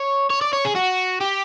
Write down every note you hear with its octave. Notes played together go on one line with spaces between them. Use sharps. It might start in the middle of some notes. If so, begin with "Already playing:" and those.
Already playing: C#5
C#5
D5
C#5
G#4
F#4
G4